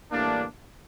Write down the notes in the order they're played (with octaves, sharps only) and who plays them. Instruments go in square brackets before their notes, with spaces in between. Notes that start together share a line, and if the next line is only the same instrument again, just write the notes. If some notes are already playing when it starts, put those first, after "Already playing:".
[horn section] A2 E3 G3 A#3 D4